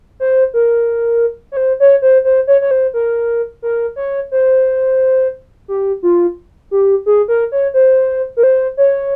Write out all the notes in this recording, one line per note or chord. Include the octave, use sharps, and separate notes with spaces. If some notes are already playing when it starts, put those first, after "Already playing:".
C5
A#4
C#5
C5
C#5
C5
C5
C#5
C#5
C5
A#4
A#4
C#5
C5
G4
F4
G4
G#4
A#4
C#5
C5
A#4
C5
C#5